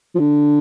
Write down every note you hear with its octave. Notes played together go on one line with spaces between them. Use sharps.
F3
D3